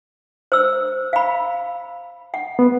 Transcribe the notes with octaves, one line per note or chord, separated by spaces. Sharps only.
C5 E6
F5 B5
F#5
B3